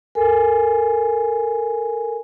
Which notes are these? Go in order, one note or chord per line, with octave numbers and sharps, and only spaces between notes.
A4 A#4 G#5